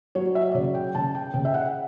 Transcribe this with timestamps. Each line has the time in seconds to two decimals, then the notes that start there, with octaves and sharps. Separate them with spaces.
0.15 F#3 C#5
0.35 E5
0.52 D5
0.55 C#3 C#5
0.75 G5
0.95 C#3 A5
1.15 G5
1.34 C#3 G5
1.45 E5
1.54 F#5